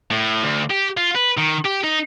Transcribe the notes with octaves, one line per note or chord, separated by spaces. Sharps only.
A2
D2
G4
F4
B4
D#3
G4
D#4